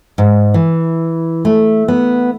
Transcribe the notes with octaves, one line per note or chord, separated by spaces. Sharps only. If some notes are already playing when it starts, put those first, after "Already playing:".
G#2
E3
A3
B3